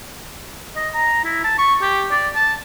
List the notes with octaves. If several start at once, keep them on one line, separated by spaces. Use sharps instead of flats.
D#5
A#5
E4
A5
C#6
G4
D5
A5